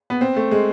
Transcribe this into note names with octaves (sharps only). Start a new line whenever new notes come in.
B3
C4
A3
G#3